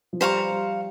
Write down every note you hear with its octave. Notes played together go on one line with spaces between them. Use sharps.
F3
G3 C5 F5 A#5 C#6
G3